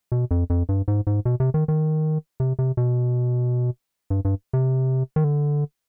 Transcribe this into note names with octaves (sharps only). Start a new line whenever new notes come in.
B2
F2
F2
G2
G#2
G#2
B2
C3
D#3
D#3
C3
C3
B2
G2
G2
C3
D#3
D3